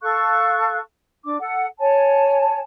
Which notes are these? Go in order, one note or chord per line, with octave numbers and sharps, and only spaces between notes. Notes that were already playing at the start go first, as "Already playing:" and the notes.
A4 F5 C#6 F#6
D4 D6
A4 F#5
C#5 G#5 A5